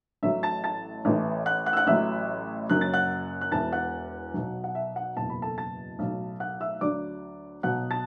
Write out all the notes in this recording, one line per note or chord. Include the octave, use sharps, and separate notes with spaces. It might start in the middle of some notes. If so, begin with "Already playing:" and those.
A1 A2 F#3 E5 E6
A5 A6
A5 A6
A1 A2 E3
F#5 F#6
F#5 F#6
E6
F#5 F#6
A1 A2 F#3 E5 E6
F#1 F#2 F#3 F#6
A6
F#5 F#6
F#6
E1 E2 E3 A5 A6
F#5 F#6
B1 B2 F#3
F#5
E5
F#5
F#1 E2 B2 A5
B5
A4 A5
A5 A6
B1 A2 F#3
F#5 F#6
E5 E6
D2 D3 F#3 D5 D6
B1 B2 F#3 F#5 F#6
A5 A6